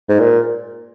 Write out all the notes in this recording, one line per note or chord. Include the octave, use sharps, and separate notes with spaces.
G#2
A#2